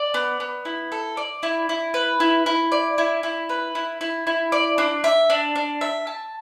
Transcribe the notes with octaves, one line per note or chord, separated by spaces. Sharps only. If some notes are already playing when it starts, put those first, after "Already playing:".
Already playing: D5
B3
B3
E4
A4
D5
E4
E4
B4
E4
E4
D5
E4
E4
B4
E4
E4
E4
D5
D4
E5
D4
D4
E5
A5